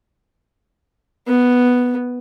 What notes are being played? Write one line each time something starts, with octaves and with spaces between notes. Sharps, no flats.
B3